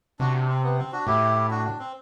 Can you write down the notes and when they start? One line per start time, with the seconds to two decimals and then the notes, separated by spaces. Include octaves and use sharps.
0.19 C3 D4 F#4
0.34 D4
0.48 C4
0.63 B3
0.78 C4
0.92 D4 F#4
1.07 A2 E4 G4
1.51 D4 F#4
1.65 D4
1.79 C4